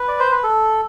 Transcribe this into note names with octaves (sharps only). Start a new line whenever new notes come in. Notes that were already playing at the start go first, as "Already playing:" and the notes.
Already playing: B4
D5
C5
B4
A4